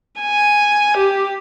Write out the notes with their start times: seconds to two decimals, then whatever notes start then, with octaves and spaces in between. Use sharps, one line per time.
0.21 G#5
0.97 G4